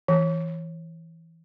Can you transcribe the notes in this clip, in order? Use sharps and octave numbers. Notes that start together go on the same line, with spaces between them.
E3